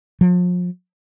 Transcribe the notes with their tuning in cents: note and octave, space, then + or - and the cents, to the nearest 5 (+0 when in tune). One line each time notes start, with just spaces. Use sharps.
F3 +40